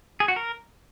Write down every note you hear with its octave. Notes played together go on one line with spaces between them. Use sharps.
G#4
F#4
A#4